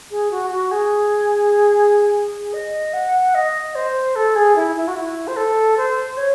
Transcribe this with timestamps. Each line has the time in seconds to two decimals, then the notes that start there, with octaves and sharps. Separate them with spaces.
0.10 G#4
0.31 F#4
0.50 F#4
0.71 G#4
2.53 D#5
2.93 F#5
3.34 D#5
3.75 C5
4.15 A4
4.35 G#4
4.56 E4
4.75 E4
4.87 F#4
4.96 E4
5.27 C5
5.36 A4
5.77 C5
6.17 C#5